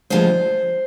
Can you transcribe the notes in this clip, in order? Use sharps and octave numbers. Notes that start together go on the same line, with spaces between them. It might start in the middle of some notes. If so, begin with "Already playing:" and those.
D2 C#3 F3 G#3 C5